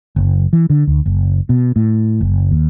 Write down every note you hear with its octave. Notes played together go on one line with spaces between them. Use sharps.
F#1
E3
D3
D2
F#1
B2
A2
F#1
D#2